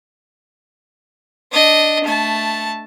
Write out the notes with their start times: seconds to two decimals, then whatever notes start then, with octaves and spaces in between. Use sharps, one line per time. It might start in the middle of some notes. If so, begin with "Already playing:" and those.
1.52 D4 D#5
2.04 A3 A5